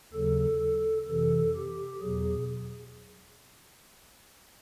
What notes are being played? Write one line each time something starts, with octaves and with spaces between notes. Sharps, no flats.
D#2 C#3 F#3 A4
F2 C3 E3 A4
G4
E2 B2 F#3 G#4